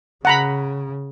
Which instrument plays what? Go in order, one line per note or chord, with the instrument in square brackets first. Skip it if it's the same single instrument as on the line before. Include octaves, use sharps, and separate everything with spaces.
[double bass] C#3 [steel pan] F#5 A#5 B5